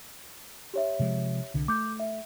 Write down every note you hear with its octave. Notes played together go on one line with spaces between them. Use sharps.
G4 C#5 E5
C3 F3 G#3
C2 D3
A3 D6 G6
E5